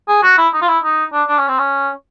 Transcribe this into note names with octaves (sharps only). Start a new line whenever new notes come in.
G#4
F#4
E4
D#4
F4
E4
D#4
D4
D4
C#4
C4
C#4